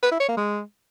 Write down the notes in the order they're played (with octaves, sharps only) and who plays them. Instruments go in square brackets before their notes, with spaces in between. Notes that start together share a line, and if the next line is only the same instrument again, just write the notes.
[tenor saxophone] B4
E4
C#5
A#3
G#3